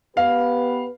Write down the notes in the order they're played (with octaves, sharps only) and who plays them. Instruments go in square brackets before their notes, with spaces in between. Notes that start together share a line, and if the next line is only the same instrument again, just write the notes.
[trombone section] B3 G4 B4 [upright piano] F5